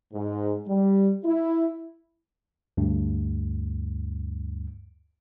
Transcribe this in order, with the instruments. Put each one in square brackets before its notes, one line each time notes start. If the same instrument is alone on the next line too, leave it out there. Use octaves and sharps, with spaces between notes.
[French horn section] G#2
G3
E4
[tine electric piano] D2 G2